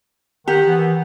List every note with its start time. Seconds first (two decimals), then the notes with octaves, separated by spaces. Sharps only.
0.48 D#3 G4 F#5
0.66 E3 B3